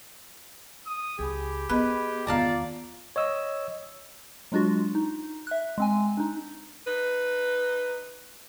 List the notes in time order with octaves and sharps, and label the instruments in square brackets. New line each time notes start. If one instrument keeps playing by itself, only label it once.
[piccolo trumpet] D#6
[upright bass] C#2 [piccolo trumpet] G4 [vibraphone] G#4 G#5 B5
[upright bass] B3 [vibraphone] G#4 D#5 [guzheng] B4
[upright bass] E2 D#3 [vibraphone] F4 [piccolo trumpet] D5 [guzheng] F5 A5 A#5
[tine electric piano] C#5 D#5 E6
[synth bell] F#3 G#3 D4 F4 F#4
D#4
E5 F#6
G#3 C4 G#5
D4 D#4
[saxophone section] D#4 B4